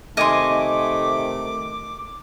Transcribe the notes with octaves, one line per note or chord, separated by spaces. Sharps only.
C3 D#3 A3 D#5 G#5 C6 D6